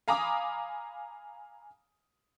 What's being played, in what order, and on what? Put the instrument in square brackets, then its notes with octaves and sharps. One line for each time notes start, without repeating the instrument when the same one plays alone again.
[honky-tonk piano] F5 G#5 A#5 B5 D6 D#6